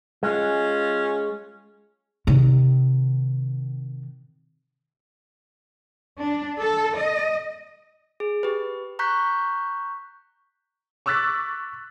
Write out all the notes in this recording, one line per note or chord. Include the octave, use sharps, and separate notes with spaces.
G#3 C#4 F4
C3 D#3
D4
A4
D#5
G#4
G4 B4
A#5 C#6 F#6 G6 B6
C#6 D6 E6 F#6 A6 B6